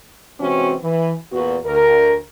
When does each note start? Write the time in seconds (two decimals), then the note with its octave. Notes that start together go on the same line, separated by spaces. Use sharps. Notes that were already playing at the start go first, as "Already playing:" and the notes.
0.39 C3 E3 G#3 C4 C#4 F#4
0.81 E3
1.32 E2 A#2 B3 F#4
1.64 D2 A#4